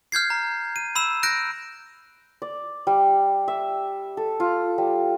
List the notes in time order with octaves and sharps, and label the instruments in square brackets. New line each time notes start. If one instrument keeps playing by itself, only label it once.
[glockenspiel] F6 G6 G#6 C7
A#5
D#7
B5 E6 E7
F#6 G6 A#6 D7
[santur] D5
G3
E5
A4
F4
G3